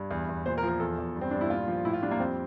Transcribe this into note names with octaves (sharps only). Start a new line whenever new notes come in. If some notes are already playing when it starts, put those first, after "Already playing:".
Already playing: G2
E2
E2
A#2 C5
A#4
F3
A#4
E2 A4
E2
G2
C4
G2 D4
E4
A#2 F4
F3
A2 E4
F4
G3 D4
A#3
F2 C4